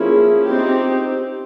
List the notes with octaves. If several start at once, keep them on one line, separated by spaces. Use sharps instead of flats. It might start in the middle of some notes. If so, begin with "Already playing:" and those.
Already playing: F3 A#3 C#4 E4 G#4
C4 D#4 G4